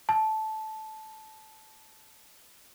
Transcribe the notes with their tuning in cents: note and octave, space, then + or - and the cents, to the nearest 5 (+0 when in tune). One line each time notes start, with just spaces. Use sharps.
A5 -15